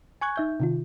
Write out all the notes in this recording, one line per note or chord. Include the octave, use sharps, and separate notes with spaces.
G#5 C#6 F#6 G#6
D#4 E5 G6
C3 D#3 F4